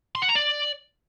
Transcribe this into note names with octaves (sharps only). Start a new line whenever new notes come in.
C6
F#5
A#5
D5